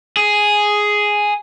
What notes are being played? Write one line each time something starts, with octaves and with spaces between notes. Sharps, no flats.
G#4